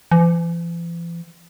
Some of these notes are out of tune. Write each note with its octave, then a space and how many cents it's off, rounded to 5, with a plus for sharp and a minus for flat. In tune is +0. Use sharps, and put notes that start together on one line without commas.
E3 +45